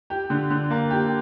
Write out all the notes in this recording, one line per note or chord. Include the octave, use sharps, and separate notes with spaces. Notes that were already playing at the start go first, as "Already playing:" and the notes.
G4
D3
D3
A#3
G4